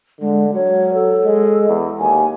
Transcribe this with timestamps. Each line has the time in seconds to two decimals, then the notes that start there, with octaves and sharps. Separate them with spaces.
0.21 D3 G#3
0.54 F#3 C#5
0.94 A4
1.25 G#3
1.69 E2
2.00 D#2 G#5